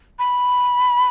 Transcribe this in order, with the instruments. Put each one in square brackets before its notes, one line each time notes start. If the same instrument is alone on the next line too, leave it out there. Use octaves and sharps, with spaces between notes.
[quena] B5